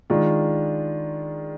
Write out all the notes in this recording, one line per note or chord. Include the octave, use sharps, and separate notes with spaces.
D#3 G#3 D4 F4